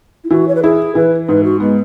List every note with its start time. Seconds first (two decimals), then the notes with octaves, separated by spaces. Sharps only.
0.24 E4
0.30 E3 F#4
0.48 C#5
0.55 B4
0.63 E4 G#4
0.95 E3 B4
1.28 G#2 B4
1.44 F#4
1.60 G#3 B3